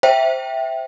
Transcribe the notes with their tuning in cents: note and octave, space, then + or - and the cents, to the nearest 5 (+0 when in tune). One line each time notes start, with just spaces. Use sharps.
C5 +0 E5 +0 G5 -5